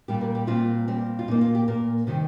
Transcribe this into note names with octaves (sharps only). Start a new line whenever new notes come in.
A#2 G3 A#3 G4
A#4
G4
A#2 G3 C4 F4
A#2 G3 C4
F4
A#2 A#3 D#4
F4
G4
A#2 A#3 A#4
C3 D#3 G3